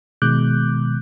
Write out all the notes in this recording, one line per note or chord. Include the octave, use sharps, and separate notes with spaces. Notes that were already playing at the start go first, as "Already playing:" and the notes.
B2 D#3 G#3 D6 F#6 G6